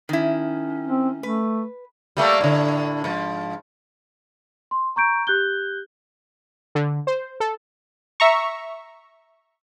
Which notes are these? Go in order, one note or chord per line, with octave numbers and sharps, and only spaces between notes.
D#3 C#4 E4
C4
A3 B4
G3 A3 A#3
A2 D3
G#2 F3
C6
A#5 C#6 G6 D7
G4 F#6 G6 G7
D3
C5
A4
E5 A#5 C#6